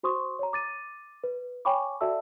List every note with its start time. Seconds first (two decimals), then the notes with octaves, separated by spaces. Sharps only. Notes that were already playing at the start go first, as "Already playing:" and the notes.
0.03 F#4 C5 C6 C#6 D#6
0.39 C#5 A#5
0.53 D6 A6 D#7
1.24 B4
1.65 C#5 G5 G#5 B5 C#6 D6
2.01 F#4 A4 D5 E5 A5 E6